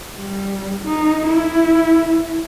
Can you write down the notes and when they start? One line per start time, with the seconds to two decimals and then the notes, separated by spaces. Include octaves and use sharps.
0.18 G3
0.84 D#4
1.27 E4